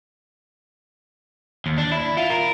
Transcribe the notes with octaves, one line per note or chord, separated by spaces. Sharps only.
D#2
D4
E4
F4
A#4